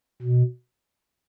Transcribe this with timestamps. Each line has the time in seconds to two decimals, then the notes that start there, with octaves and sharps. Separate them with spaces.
0.22 B2